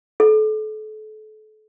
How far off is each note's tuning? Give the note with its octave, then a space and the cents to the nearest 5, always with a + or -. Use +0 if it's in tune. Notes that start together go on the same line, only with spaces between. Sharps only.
A4 -35